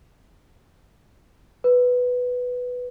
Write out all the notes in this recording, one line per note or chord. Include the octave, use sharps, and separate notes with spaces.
B4